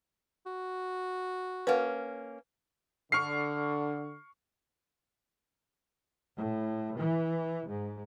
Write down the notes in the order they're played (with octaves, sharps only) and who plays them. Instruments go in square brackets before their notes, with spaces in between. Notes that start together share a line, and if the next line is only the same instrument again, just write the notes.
[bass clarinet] F#4
[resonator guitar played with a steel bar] A#3 C#4 [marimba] B4 F#5
[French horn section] D3 [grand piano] C#6 F6 C7
[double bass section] A2
E3
G#2